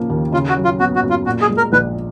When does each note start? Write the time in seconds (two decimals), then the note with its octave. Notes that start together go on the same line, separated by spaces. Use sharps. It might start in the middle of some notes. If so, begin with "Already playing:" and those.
Already playing: C#3 F3 A#3
0.10 D#2
0.32 C#3 F4
0.49 F#4
0.57 F#3
0.65 F4
0.80 B3 F#4
0.95 F#4
1.02 F#2
1.10 F4
1.26 A#2 F#4
1.42 G#4
1.49 G#3
1.57 A#4
1.73 A#1 B4